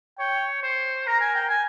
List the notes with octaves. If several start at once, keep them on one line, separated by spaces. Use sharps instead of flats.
C#5 G5
C5
A#4 A#5
G#5
G5
G#5